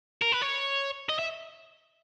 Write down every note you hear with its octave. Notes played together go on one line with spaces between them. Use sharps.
A#4
B4
C#5
D#5
E5